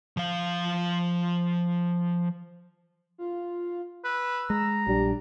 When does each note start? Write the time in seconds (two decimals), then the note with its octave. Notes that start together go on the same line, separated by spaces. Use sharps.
0.17 F3 F5
3.18 F4
4.04 B4 E6
4.50 G#3 A#5
4.87 A#1 G3 D4